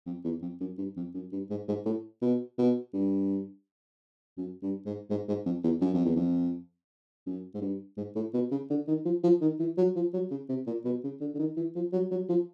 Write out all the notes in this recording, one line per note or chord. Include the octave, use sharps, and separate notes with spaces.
F2
E2
F2
F#2
G2
F2
F#2
G2
G#2
G#2
A2
B2
B2
G2
F#2
G2
G#2
G#2
G#2
F2
E2
F#2
F2
E2
F2
F#2
G#2
G2
G#2
A2
B2
C#3
D3
D#3
F3
F3
D#3
E3
F#3
F3
F#3
C#3
C3
A#2
B2
C#3
D3
D3
D#3
E3
F3
F#3
F#3
F3